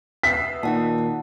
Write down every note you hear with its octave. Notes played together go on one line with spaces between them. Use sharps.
B3 E5 B6 C7
A#2 D#3 D#4 F#5 A5